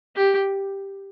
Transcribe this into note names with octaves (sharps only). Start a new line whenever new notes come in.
G4